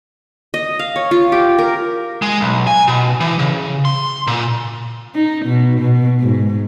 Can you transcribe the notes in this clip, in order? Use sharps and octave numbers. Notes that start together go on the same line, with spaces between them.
D#5
F5
C#5
F4
G4
A#4
G#3
B1
G#5
B2
E3
C#3
C6
A#2
D#4
B2
B2
G#2